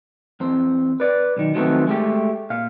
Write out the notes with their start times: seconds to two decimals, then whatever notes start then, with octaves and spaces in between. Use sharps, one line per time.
0.40 E2 C4
1.00 B4 D5
1.37 B1 D#3
1.55 D#3 F3 F#3 A3 B3 C4
1.88 G#3 A3 G4
2.50 A#2 F5